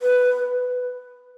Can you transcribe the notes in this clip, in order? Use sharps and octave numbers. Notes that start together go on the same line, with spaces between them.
B4